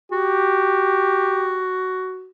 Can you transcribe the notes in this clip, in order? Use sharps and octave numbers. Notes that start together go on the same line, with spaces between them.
F#4 G4